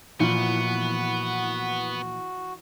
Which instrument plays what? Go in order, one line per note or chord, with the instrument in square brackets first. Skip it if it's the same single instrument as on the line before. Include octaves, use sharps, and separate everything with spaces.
[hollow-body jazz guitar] A#2 F3 [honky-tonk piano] E3 [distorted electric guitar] B3 [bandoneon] F#4